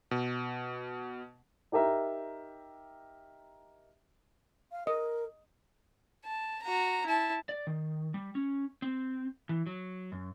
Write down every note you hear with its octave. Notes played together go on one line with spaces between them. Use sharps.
B2
D#4 G4 A#4 E5 A#5
F5
A#4 D#5
A5
F#4 A#5
E4 A5
D5
D#3
G3
C#4
C4
E3
F#3
F#2